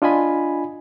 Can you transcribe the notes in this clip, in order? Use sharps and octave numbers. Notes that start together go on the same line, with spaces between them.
D4 F4 D#5 G#5 B5